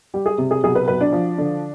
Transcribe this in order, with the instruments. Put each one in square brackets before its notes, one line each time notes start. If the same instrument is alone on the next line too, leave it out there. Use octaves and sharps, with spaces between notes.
[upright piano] G3 G4
G#4
C3
G#4
B1 G#4
B4
B1 B4
D4
F3
D3